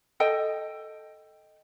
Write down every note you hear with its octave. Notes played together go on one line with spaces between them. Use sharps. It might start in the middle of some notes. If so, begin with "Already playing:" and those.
A4 D#5 G5